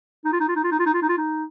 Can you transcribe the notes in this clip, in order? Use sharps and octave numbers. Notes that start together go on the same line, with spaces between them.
D#4
F4
D#4
F4
D#4
F4
D#4
F4
D#4
F4
D#4
F4
D#4